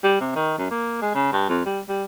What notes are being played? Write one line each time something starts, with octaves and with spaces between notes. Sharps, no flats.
G3
C3
D#3
F#2
A#3
G#3
C#3
G2
F2
G3
G3